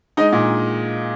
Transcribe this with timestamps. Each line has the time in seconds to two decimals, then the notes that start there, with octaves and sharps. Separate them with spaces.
0.17 G#3 D#4 D#5
0.32 A#2